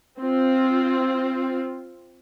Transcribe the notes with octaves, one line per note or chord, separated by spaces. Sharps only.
C4 F4